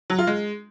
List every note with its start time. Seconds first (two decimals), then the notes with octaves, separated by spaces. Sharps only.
0.10 F#3
0.18 F4
0.27 G#3